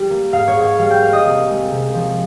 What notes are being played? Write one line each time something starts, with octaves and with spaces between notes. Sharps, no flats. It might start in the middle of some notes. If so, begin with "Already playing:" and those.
Already playing: G3
A#3
G#2 F5
C#5
G#2
C#5
G3 F5
G5
A#3 F5
D#5
C2
G#3
C3
F3